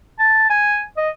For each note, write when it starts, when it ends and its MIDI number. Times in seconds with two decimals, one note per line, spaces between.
0.19 0.45 81
0.50 0.82 80
0.97 1.10 75